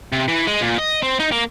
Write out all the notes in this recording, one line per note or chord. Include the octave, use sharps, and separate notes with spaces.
C3
E3
G#3
A#2
D#5
C4
D#4
A#3